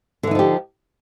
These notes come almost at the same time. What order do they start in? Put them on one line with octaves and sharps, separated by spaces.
D3 E3 D#4 F3 G4